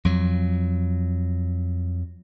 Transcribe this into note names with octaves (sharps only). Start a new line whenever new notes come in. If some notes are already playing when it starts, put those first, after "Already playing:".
F2 F#3